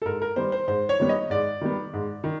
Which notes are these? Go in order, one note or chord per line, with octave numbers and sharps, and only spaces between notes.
A4
G#2 A#4
A#4
D#3 G3 B3 C5
C5
G#2 C5
C#5
D#3 G3 B3
D#5
G#2 D5
D#3 G3 B3
G#2
D#3